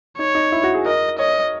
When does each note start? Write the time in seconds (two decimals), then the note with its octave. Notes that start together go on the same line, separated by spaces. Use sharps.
0.18 D#4 C#5
0.35 D#4
0.52 E4
0.63 F#4
0.74 G#4
0.85 A#4 D#5
1.19 C#5 D#5